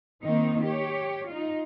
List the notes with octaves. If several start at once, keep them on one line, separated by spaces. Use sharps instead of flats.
D#3 A#3 C4 D#4
G4 C#5
D#4 F4